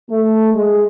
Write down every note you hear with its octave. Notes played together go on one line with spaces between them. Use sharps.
A3
G#3